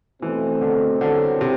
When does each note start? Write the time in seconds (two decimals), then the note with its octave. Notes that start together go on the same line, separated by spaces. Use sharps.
0.22 B2 E3 A3 C4
0.61 D3
1.01 C2 B2 D3 F#3 C4
1.41 C3